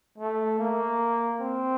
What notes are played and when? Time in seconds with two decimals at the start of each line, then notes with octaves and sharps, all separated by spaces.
0.18 A3
0.59 A#3
1.40 C4